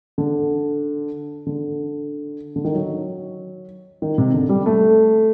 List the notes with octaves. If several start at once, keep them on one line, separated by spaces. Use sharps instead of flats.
D3
D3
D3
D#3
F#3
D#3
C3
D3
G3
A3